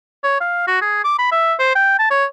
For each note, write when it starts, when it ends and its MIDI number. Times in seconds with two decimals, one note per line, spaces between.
0.24 0.39 73
0.41 0.67 77
0.67 0.80 66
0.81 1.03 68
1.04 1.14 86
1.19 1.30 83
1.32 1.54 76
1.59 1.71 72
1.75 1.94 79
1.99 2.07 81
2.11 2.25 73